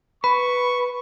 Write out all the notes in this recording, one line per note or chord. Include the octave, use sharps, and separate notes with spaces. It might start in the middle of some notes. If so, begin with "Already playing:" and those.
B4 B5 C#6